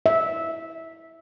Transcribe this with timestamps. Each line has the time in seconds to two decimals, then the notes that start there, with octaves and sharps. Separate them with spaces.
0.06 E5